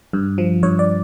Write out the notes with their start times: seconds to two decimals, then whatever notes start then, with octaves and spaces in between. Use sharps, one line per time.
0.13 G2
0.38 F3
0.63 G2 C#5
0.79 D5